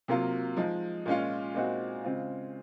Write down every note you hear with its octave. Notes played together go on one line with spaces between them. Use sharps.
C3 F#3 A#3 F4
F3 G#3 D#4
A#2 G#3 C#4 F4
A#2 G#3 C4 D#4 F#4
C#3 G#3 C4 F4